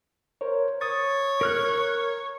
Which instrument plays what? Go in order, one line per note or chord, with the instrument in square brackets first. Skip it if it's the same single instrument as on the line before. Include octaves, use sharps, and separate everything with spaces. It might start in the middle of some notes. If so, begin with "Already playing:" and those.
[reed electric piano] A#4 C5 C#5
[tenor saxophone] C#5 [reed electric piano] D#6 A6
[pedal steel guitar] A#4 F6 F#6